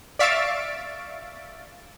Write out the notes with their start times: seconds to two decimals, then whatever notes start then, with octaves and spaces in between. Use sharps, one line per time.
0.19 D5 E5 F5 C#6 A6 D7